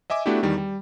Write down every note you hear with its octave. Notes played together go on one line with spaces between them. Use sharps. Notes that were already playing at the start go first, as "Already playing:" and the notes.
D#5 E5 G#5 D6
A3 B3 D4 E4 F#4 G4
E2 D#3 G3
G3